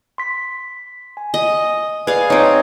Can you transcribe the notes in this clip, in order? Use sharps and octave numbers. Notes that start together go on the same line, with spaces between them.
C6 B6
G#5
D#5
G#4 B4 D5 F5
C4 D#4 C#5 G#5